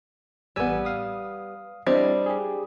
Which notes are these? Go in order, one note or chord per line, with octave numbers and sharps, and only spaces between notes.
A1 G3 B3 G#5 E6
F5 D#6
G3 C4 D4 E4 G4 D#5
G4 G#4